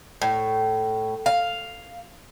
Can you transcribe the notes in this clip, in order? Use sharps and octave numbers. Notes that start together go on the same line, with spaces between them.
A2
F5